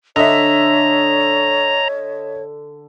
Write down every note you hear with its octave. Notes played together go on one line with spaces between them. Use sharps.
D3 C#5 D#5 E5 A#5